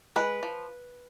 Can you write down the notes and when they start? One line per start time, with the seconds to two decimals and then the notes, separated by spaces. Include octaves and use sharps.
0.16 G#3 B4
0.43 F3